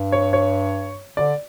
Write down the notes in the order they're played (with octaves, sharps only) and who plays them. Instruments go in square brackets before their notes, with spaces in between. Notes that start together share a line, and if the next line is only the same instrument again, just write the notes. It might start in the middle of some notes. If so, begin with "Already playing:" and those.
Already playing: [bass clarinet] G2
[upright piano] C#5
C#5
[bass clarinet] D3 [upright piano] D5